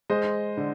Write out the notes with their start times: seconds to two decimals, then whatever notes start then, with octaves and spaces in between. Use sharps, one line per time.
0.10 G#3 C5 D#5
0.57 D3